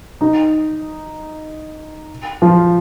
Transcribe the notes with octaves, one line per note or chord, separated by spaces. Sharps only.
D#4
F3